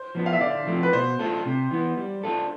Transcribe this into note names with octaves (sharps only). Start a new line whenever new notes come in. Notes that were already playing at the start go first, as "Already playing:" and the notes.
Already playing: C5
F3 B3 D4
F5
E5
D3 D5
F3 A3 C4
B4
B2 C5
A3 D4 F4 A4
C3
E3 B3
G3
D4 F4 A4